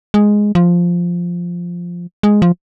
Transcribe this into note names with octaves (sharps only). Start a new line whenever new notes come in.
G#3
F3
G#3
F3